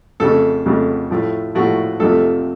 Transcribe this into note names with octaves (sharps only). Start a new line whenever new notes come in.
F2 C#3 A3 A4
F2 C#3 A3
A2 F3 A3
A2 F3 A3 F#4
F2 C3 F3 A3 A4